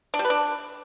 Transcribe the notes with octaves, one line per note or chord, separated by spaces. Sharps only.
D4
G3
B4
D4